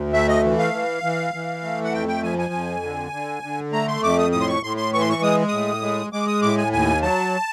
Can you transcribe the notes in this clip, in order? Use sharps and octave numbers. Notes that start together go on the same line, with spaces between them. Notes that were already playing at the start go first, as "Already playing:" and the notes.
Already playing: D2
A3 E5
D#5
E3
F5
E3
E3
E3
A3
F#5
F2 G5
G5
F3 G#5
G#5
F2
D3
D3
D3
A3 A#5
C6
F2 D6
D#6
A2 D#6
C6
C#6
A2 C6
C6
E3 C#6
C6
C#6
G#3 D#6
A2 D#6
G#3
G#3 D6
D#6
A2 D6
G#5
D#2 G#5
F#3 A5